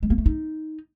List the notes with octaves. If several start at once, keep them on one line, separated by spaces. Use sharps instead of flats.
G#3
A#3
A3
D#4